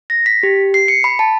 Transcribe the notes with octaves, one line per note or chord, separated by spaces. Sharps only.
A#6
B6
G4
C7
C#7
B5
A5